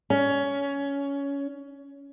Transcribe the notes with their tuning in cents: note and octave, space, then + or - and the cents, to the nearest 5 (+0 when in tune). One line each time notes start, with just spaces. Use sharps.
C#4 +15